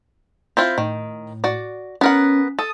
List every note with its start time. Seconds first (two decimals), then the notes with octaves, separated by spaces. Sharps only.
0.57 C4 E4 F4
0.78 A2 D#3
1.44 F#4 D5
2.01 B3 C#4 A#4 F#5
2.59 A4 D#6